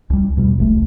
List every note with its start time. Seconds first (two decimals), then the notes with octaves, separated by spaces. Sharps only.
0.10 C#2 G3
0.37 E2 B2 G3
0.58 E1 C2 A3